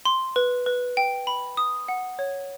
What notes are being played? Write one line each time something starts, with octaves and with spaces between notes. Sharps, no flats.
C6
B4
B4
G5
B5
D#6
F#5
C#5